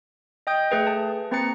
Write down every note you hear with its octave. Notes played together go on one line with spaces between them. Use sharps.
D#5 G5 D#6 G6
A3 G#4 B4 G5
A5
A#3 C4 B4 A#5 A6 C#7